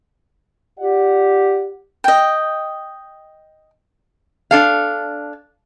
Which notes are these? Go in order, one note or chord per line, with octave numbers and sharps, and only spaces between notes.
F4 G4 D5 F#5
D#5 G5
D4 A4 F5